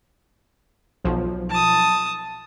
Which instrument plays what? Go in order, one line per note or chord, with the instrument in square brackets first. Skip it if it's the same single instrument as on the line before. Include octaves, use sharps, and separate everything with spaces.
[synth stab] B1 F3
[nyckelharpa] A5 D#6